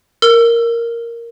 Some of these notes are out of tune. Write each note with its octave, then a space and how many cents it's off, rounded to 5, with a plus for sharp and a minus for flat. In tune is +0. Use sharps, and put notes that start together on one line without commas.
A#4 +0 E6 +25